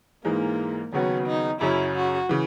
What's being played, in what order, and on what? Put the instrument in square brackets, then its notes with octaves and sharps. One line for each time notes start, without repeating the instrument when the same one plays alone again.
[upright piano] G#2 E3 G#3 D#4 [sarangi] A#3
[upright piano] D#2 C#3 F#3 B3 F#4 [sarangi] C#4
[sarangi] D#4
[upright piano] F#2 C#3 F#3 C#4 [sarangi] E4
[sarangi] F#4
[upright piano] C#3 E3